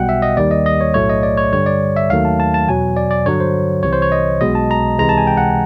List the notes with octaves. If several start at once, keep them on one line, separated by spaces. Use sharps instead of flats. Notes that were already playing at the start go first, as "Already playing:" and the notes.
Already playing: B1 B2 G3 F#5 G5
E5
D#5
D#2 D#3 G3 D5
D#5
D#5
C#5
B1 A2 F#3 A3 C#5
D#5
D5
C#5
G2 D3 G3 C#5
D5
E5
D#2 D#3 F#3 A3 F5
A5
A5
A5
E2 B2 F#3 G#5
D5
D5
G2 D3 F#3 C#5
C5
C2 C3 E3 C#5
C5
C#5
D#5
B1 B2 G#3 D#5
A5
A#5
C#2 C3 E3 G#3 A#5
A5
G#5
G5
F#5